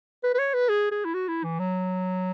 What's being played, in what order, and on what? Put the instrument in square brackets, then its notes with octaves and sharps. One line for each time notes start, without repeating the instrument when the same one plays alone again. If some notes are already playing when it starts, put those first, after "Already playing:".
[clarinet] B4
B4
C#5
B4
G#4
G#4
E4
F#4
E4
E3
F#3